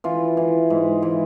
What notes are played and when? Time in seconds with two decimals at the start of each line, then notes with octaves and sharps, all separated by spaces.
0.04 E3 F4
0.37 E3
0.70 G#2
1.02 E3